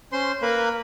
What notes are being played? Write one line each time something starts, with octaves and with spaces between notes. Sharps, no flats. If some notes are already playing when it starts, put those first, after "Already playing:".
C#4 C5 C6
A#3 A#4 B4 B5